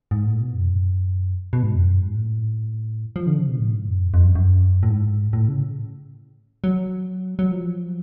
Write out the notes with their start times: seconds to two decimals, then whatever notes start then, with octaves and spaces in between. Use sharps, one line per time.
0.11 G#2
0.26 A2
0.40 B2
0.55 F#2
0.61 F2
0.69 F#2
1.53 B2
1.63 G#2
1.75 F2
1.86 F#2
2.00 G#2
2.14 A2
3.16 F3
3.27 D3
3.37 C#3
3.48 B2
3.59 A2
3.74 G#2
3.88 F#2
4.02 F2
4.14 F2
4.24 F#2
4.35 F#2
4.83 A2
4.89 G#2
5.33 A2
5.48 C#3
6.64 F#3
7.39 F#3
7.51 F3